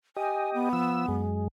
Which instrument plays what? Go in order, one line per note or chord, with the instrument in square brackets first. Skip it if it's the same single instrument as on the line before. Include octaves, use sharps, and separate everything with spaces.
[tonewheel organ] G4 D#5 [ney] G#5
[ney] B3
[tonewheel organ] F3 E6
F#2 G#3